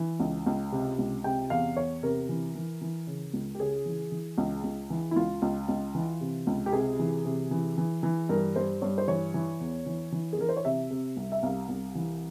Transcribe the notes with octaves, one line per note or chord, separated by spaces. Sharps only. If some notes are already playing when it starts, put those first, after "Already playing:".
Already playing: E3
C#2
C#2
C3
C#2
C3 G5
E2 F5
E2 C#5
C3 A#4
E3
E3
E3
C#3
C#2
G4
C#3 G#4
E3
E3
C#2
C#2
E3
E4
C#2 F4
C#2
C#2
E3
C3
C#2
G4
C3 G#4
E3
C3
E3
E3
E3
G2 A#4
G2 C5
G2 C#5
C5
E3 C#5
E3
E2
E3
E3
G#4
E3 A#4
C5
C#5
C3 E5
C3
C2
E5
C2 F5
C2
E3